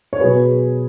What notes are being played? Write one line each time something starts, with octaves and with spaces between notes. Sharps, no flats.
C#5
B2 F#3 G#4 B4